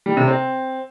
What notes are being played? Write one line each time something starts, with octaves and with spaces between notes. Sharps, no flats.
G3
C3
C4